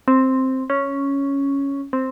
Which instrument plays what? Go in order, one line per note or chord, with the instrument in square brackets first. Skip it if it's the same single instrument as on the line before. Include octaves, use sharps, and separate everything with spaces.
[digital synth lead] C4
C#4
C4